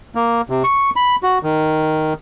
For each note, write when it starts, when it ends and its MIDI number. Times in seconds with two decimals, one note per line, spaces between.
0.15 0.42 58
0.50 0.63 48
0.64 0.90 85
0.96 1.16 83
1.23 1.38 66
1.43 2.13 51